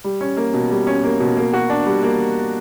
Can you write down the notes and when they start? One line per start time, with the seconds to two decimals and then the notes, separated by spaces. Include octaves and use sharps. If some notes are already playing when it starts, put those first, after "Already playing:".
0.04 G3
0.21 C#4
0.37 A#3
0.54 B2
0.71 G3
0.87 C#4
1.04 A#3
1.20 B2
1.37 A#3
1.53 F#4
1.70 D4
1.86 G3
2.03 A#3